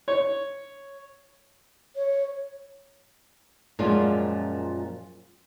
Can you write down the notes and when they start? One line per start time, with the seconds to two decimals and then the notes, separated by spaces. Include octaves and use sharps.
0.08 C#5
1.96 C#5
3.79 F#2 A#2 F3 G#3 C#4 F4